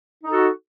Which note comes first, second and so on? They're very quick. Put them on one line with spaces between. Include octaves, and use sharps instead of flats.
D#4 A4 F#4